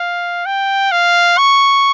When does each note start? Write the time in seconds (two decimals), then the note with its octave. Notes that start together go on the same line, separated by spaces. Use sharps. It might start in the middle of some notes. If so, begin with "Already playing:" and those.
Already playing: F5
0.46 G5
0.91 F5
1.38 C#6